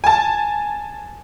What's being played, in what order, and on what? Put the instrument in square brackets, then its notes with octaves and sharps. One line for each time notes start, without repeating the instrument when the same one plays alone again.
[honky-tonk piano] G#5 A5